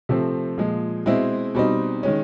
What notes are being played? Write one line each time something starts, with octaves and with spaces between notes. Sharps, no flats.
C3 F3 A3 C4
A#2 F3 G#3
B2 G#3 C4 E4
B2 G3 C4 D#4
D#3 G#3 C#4